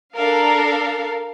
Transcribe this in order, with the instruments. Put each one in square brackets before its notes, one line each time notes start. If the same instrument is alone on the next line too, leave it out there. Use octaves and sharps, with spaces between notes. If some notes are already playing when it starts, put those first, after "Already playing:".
[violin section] D4 A4 A#4 F5